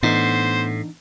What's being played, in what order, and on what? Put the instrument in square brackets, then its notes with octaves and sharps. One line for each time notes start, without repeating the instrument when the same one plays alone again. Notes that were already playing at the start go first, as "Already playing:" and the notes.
[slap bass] A2 [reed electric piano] E3 D4 D#4 [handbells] B3 [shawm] C5